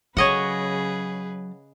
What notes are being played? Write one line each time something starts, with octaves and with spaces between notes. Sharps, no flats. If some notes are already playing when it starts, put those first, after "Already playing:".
C#3 F#3 G#4 B4 C#5 D#5 F#5